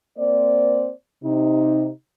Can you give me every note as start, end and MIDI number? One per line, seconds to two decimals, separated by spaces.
0.18 0.91 58
0.18 0.91 60
0.18 0.91 72
0.18 0.91 74
1.24 1.88 48
1.24 1.88 63